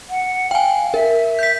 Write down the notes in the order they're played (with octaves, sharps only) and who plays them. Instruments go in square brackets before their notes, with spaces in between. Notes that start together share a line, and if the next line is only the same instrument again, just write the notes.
[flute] F#5
[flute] F5 [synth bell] G5 G#5
[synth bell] A#4 [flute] E5
[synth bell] G6 B6